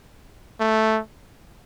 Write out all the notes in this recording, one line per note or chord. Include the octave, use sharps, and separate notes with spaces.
A3